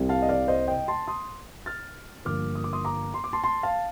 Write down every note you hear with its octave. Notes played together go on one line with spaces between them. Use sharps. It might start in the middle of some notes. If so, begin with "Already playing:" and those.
Already playing: C2 C3 G3 C4
F5 A5
D#5
D5 F5
C5 D#5
D#5 G5
A5 C6
C6 D#6
F6 A6
G1 G2 F3 A#3 D6 F6
D#6
D6
C6 D#6
A#5 D6
C6
D6
A5 C6
A5 C6
F5 A5